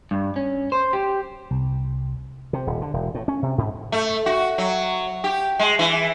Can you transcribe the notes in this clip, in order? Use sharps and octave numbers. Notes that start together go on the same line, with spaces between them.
G2
C#4
C5
G4
C2
C3
D#1
D3
E1
A2
C#4
C3
G#2
A3
F#4
F#3
G4
G#3
E3